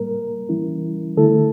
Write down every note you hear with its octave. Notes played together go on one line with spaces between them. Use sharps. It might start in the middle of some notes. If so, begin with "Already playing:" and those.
Already playing: A2 G3 A#3 A#4
E3 G3 C#4 E4
D3 A3 E4 A4